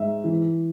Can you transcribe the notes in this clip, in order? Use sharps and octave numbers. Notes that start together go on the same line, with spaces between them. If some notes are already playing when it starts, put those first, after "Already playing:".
Already playing: G#2 E5
E3